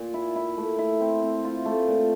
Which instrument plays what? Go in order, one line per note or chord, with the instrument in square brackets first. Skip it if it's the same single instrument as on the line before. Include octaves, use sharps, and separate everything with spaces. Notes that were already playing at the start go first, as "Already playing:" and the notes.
Already playing: [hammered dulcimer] A#2
E4
E4
A3
E4
C4
C4
F4
A3
A#2